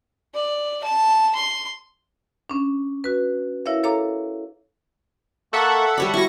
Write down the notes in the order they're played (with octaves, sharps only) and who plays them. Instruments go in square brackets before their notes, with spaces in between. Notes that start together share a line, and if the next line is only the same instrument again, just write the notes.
[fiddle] D5
A5
C6
[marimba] C#4 D4
F#4 B4
E4 A#4 C#5 E5 F5
A4 C#5 F5 A#5 D6
[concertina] A#3 A5 C#6 [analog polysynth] A4 E5 F#5
[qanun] G3 C#5 B5 [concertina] D5
[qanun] E4 F#4 [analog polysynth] C#6 A#6